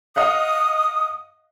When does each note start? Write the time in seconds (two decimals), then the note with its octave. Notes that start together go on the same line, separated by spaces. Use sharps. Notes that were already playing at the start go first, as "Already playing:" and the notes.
0.16 D#5 F5 F#5 D#6